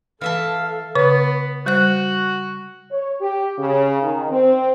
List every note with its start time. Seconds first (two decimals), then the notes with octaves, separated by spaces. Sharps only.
0.21 E3 A4 E5 F5 A5
0.95 C#3 B3 B4 C#5
1.66 G3 F#4 C5 F#6
2.91 C#5
3.20 G4
3.58 C#3
4.01 D#3
4.30 C4